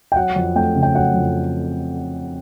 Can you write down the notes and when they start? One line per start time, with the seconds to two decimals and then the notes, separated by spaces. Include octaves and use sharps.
0.12 G5
0.16 F#3 F#5
0.36 F2
0.55 A3 G5
0.75 C#3
0.83 G5
0.95 F#3 F#5
1.14 F2